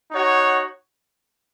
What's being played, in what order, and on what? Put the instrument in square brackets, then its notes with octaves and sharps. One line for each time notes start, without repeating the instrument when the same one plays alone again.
[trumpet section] D#4 F#4 C#5 F#5